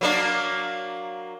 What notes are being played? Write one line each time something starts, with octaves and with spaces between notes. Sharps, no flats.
F#3 A#3 D4